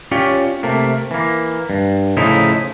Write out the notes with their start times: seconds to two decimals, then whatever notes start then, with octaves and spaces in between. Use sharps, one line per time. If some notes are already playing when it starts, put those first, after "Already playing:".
0.11 C#4 F4 G4 C#5 D5
0.63 C3 A3 A#3
1.11 E3 A#3
1.70 G2
2.17 A2 C#3 F3 D#4 E4